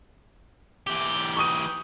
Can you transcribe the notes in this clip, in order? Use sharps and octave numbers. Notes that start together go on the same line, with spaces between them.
E3 G4
C#6 D#6 D#7